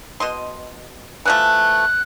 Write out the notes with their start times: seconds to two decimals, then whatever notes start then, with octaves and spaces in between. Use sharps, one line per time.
0.20 B2 D#5 C6
1.25 E3 F3 A3 F#6